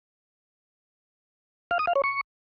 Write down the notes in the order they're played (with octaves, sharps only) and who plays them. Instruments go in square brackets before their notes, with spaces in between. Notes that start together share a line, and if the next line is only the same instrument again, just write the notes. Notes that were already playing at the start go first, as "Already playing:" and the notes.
[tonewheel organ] F5
D#6
F5
C#5
C#6